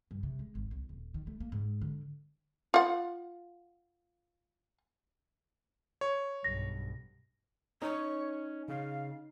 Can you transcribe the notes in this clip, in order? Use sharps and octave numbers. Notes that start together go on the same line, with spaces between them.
G2
C3
G#3
G#1
C2
D#1
D#3
A3
A#3
G#2
D3
F4 F#5
C#5
B1 G2 A#6
C#4 D#4 C#5
C#3 F5